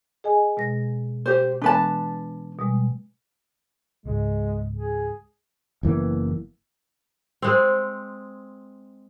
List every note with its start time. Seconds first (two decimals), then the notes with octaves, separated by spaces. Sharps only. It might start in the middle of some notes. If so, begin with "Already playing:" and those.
0.24 G#4 D#5 G#5
0.57 B2 G#3 A#6
1.26 G4 C5
1.62 E3 G#3 B3 D4 B4 A5
2.59 B2 G3 G#3
4.06 C#2 G#2 G#3
4.77 G#4
5.83 F#1 E3 A#3 B3
7.42 G#3 C4